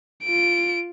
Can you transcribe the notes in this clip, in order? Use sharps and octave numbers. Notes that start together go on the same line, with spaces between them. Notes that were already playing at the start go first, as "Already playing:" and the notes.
F4 D7